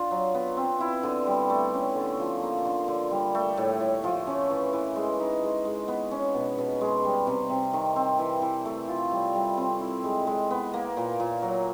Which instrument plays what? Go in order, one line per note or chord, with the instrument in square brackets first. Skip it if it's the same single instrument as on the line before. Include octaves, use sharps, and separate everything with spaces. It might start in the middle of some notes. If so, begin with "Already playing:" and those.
Already playing: [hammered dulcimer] D4 F4
F#3
B3
C4
E4
D3
G3
A3
C#4
D3
F3
A#3
D3
D3
G3
A3
A2
A2
F3
C#4
E3
E3
G#3
D#4
G#3
G#3
B3
C#4
B2
B2
G#3
G3
C3
C3
D#3
C4
E3
E3
A3
F4
G3
G3
C4
E4
G#3
G#3
B3
A#3
A#2
A#2
F#3